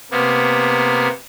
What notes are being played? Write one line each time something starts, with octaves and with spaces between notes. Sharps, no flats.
C3 A#3 B3